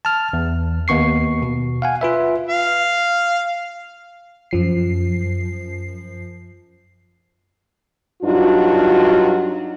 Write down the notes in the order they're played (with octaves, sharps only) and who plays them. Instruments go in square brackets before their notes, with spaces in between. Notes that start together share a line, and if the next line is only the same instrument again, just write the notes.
[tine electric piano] A5 F6
E2
D#2 B3 C#6 C7
B2
F5 F#5 G#5
F4 B4 E5
[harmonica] F5
[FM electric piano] F#2 F3 C7
[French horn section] G2 F#3 D4 D#4 F4 F#4